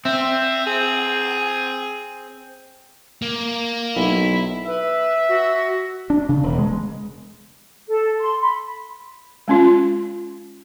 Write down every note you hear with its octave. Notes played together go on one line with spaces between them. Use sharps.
C4 E5
G#4
A#3
B1 E4
B4 E5
F#4
D4
C#3
E1
G#3
A4
C6
B5
G#3 C#4 F4